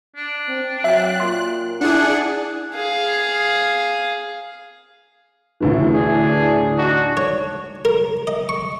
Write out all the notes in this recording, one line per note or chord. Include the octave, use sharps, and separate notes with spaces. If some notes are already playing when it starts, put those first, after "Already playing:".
D4
C4
F#3 E5 G5 F#6
A#2 C6
D4 E4 G#4 F#5
G#4 F5
D2 A2 E3
D4 G#4
D4 D#4 F#4
C#5
A#4
D#5
C#6